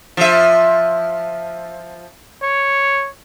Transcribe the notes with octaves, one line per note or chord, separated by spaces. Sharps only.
F3 E5
C#5